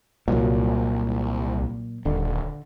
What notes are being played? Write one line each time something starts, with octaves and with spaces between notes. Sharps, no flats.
C2 A#2 F#3
D#1 D3